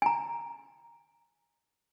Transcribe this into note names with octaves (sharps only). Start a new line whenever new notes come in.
G#5 A#5